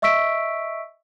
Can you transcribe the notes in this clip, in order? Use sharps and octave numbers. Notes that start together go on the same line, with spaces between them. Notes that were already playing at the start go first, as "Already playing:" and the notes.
D#5 E5 C#6 E6 B6 D7